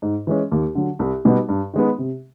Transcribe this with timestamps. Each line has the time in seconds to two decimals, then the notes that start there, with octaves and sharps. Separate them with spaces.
0.02 G#2
0.27 E3 G#3 C#4
0.52 D#2
0.75 D3 F#3
0.99 C2
1.25 B2 G3 B3 D#4
1.49 G2
1.74 D#3 G#3 B3
1.98 C3